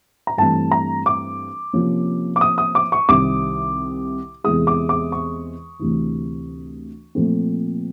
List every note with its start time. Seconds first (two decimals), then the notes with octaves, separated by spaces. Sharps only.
0.27 A#5
0.38 G2 E3 A3 C4 A5
0.71 A#5
1.06 D6
1.73 C3 F3 A#3 C#4
2.36 D6
2.41 D#6
2.58 D#6
2.75 D6
2.92 C#6
3.09 C2 C3 D#3 D6
4.44 E2 C3 E3 G#3 D#6
4.67 D6
4.89 D6
5.12 C#6
5.79 D2 C3 E3
7.15 A#2 F3 A3 C4